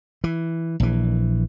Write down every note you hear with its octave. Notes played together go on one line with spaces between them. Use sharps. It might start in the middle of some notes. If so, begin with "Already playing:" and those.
E3
A#1 E3